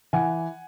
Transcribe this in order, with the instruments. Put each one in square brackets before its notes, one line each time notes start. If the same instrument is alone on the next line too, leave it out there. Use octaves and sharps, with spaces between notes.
[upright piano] E3 F#5 G#5